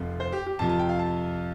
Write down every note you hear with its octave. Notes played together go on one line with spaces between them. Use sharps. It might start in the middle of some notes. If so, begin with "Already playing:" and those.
Already playing: F1 F2 F3
C5
G4
G4
F2 C3 F3 A5
A5
G5
F5
A5